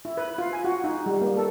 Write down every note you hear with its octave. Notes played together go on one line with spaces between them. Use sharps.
E4
B4
F4
G#5
F#4
D#4
G3
A#3
A4